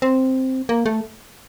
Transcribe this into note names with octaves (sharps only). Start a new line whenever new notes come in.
C4
A#3
A3